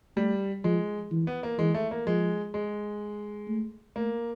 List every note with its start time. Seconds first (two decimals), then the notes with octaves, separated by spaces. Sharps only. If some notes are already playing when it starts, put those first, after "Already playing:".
0.17 G3 A3
0.64 F3 G#3
1.12 E3
1.27 B3
1.43 A#3
1.59 E3 G#3
1.74 A3
1.91 A#3
2.07 F3 G#3
2.54 G#3
3.48 A3
3.96 A3 A#3